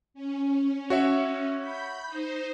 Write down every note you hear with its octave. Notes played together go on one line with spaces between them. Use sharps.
C#4
F#4 C#5 E5
B5 G6
D#4 C5